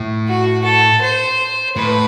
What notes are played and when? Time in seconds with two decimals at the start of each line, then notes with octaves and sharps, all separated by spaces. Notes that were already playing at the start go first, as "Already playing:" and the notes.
Already playing: A2
0.28 F#4
0.64 A4
1.01 C5
1.76 A2 B4